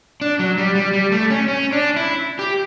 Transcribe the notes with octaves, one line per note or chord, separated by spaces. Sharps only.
D4
F#3
G3
G3
G3
A3
C#4
C#4
D4
E4
G4